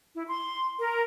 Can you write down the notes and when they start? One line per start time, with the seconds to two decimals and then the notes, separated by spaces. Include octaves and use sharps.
0.15 E4
0.28 C6
0.79 A#4